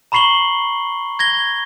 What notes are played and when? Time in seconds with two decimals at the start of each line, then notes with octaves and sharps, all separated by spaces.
0.12 A#5 B5 C#6 C7 F#7 G7
1.19 G#6 A#6 G7